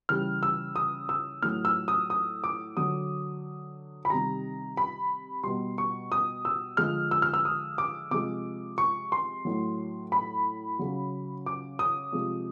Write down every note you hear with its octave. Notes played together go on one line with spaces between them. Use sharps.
C#3 E3 G3 F6
E6
D#6
E6
A2 F#3 F6
E6
D#6
D#6
D6
D3 F#3 D#6
B5
C3 D#3 G3 A#5
B5
B2 G3 C6
C#6
D#6
E6
D3 F3 G#3 F6
E6
F6
E6
D#6
D6
C3 F3 G#3 D6
C#6
C6
A2 F#3
B5
C#3 F#3
D6
D#6
C3 F3 G#3